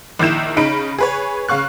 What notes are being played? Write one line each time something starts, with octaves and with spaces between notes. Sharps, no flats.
A#1 D#3 E4 G6 E7
C#3 D#4 B5 D7
G#4 B4 C#5
C#3 F5 C#6 F#6